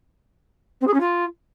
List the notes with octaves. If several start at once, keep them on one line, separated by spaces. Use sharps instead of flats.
C4
G#4
C#4
F4